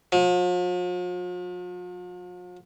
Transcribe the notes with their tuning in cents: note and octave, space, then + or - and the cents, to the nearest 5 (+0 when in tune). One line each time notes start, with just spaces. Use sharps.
F3 +45